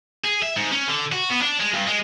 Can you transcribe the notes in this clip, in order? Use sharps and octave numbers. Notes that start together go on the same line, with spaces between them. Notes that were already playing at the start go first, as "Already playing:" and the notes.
G#4
E5
G#2
C#4
D3
F#4
B3
D4
G#3
G2
G#3